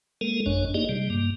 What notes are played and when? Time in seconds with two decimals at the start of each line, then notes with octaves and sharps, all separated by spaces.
0.21 G#3 A#3 A4 A#4
0.46 G#1 F#2 D4 C#5
0.74 A#3 D#4 G4 G#4 D5 D#5
0.89 C3 G3
1.10 G2 A#3